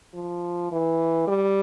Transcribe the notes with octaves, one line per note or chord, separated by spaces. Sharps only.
F3
E3
G3